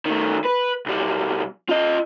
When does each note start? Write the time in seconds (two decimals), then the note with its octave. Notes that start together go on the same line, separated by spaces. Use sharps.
0.06 D#3 A3
0.45 B4
0.86 B1 G3
1.69 F4 D#5